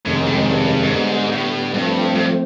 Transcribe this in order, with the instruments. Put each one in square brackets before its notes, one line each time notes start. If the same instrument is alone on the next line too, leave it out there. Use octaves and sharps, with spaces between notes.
[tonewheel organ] F2 C3 D#3 G#3 C#4 [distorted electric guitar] A2
[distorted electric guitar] G#2
A2
G#2
G2
A2
[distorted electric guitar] G#2 [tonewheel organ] D3 G3 B3
[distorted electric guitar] A2
[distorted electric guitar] G2 [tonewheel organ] F3 A3 C4
[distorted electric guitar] G2